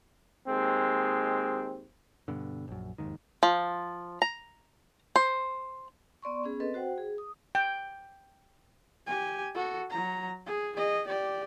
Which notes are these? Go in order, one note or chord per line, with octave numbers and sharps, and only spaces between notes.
D#2 G#3 C4
G2 B2 D3
A#1 F#2
F1 D#2 G#2 D#3
F3
A#5
C5
B3 D5 C6 C#6
B3 C#4 G#4
C4 A4 B4 D#5
F#4 C5 F#5 G5
G#4
D#6
G5
G4 G#5
F#4 A4
F#3 A#5
G#4
G#4 D#5
G4 D5